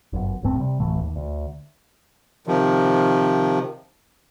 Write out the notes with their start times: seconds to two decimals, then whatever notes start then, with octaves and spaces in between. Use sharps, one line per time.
0.13 G1 F#2
0.43 D1 G2 A3 C4
0.57 C3 G3
0.80 D1 A1 E3 A3
1.03 D#2
1.16 D2
2.47 C3 D#3 F3